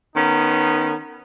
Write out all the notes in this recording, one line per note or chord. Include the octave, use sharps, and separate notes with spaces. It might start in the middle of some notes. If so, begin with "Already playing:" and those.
D#3 B3 C#4 D#4